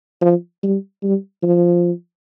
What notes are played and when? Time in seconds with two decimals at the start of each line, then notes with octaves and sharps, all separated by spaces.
0.22 F3
0.63 G3
1.03 G3
1.43 F3